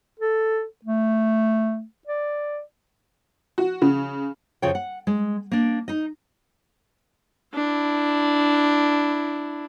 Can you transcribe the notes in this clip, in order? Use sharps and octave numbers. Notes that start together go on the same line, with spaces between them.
A4
A3
D5
F#4
C#3
F2 C#3 F4 A4 C#5 G5
F#5
G#3
A#3 D4
D#4 D#5
D4 E4